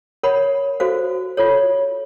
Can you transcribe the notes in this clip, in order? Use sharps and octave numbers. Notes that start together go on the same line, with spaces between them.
A#4 C#5 F#5 B5
F#4 A4 C5 F5
F4 A4 C#5